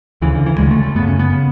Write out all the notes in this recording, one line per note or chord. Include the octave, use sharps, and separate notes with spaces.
D2 C#3 E3
D3
E3
D2 C#3 G#3
A3
A3
F#2 C#3 B3
C#4
B3
C#3